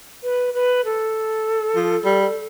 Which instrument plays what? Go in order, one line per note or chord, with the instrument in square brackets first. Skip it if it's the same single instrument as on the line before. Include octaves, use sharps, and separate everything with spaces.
[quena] B4
B4
A4
[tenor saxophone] F3
G3